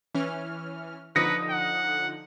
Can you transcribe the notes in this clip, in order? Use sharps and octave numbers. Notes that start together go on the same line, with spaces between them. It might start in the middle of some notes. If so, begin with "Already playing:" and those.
E3 C#4 F6
D3 F3 D#4 B4 D#6 A#6 C#7
F#5